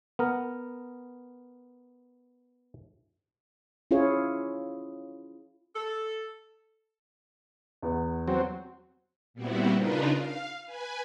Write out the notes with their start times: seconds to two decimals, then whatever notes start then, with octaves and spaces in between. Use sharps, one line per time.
0.19 B3 A#4
3.91 C#4 E4 F4 G#4 C#5
5.76 A4
7.82 E2 B3
8.28 F#3 C4
9.34 A#2 G3 B3 C4 E4 F#4
9.74 C#3 D4 D#4 F4 A#4 B4
10.13 F5
10.65 B4 G#5